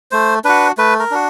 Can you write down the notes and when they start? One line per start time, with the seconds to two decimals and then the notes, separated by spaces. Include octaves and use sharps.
0.12 A3 C5
0.44 D4 F#4 B4
0.78 A3 B4
0.99 A#4
1.11 D4 F#4